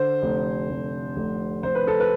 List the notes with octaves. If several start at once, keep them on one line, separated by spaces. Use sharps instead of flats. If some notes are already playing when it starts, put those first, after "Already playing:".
Already playing: D3 C5
F1
F1
F1
F1 C5
B4
A4
B4